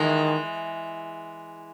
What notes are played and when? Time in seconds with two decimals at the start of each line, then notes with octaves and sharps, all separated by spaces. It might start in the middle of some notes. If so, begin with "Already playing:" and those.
Already playing: D#3 E3 G#3